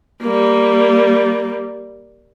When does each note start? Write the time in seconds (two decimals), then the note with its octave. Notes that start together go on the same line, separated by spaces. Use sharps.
0.22 G3 A#3